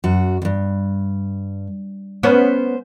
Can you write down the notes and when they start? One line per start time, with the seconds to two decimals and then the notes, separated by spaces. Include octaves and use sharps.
0.04 F#2 F#4
0.42 E2 G2
2.23 B3 C#4 C5